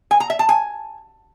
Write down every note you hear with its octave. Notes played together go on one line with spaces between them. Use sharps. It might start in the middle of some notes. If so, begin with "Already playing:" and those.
G#5
A#5
E5
A5
G#5